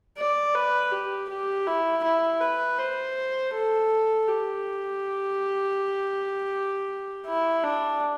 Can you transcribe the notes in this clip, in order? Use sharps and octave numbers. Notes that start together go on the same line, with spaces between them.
D5
B4
G4
G4
E4
E4
B4
C5
A4
G4
E4
D4